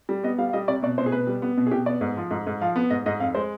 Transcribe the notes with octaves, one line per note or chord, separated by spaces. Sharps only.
G3
B3 D#5
G3 F5
F5
G3 D#5
C3 D5
B2 D5
B2 C5
G#4
B2 B4
G3
B3
B2
G#4
B2 G4
B3 D5
G#2
F3
G#2
G#2
F3 F5
B3
G#2 D#5
G#2 D#5
F2 F5
G#3 C5